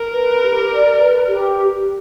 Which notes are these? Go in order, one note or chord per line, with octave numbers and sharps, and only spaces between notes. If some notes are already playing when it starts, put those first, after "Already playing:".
Already playing: A#4
B4
G4
D5
B4
G4